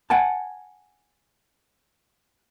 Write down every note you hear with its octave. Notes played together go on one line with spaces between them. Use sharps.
F#5 G#5 A5